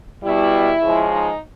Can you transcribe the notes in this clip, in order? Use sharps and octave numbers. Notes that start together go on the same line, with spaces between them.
B2 G3 E4
C#3 F3 G#3
D#4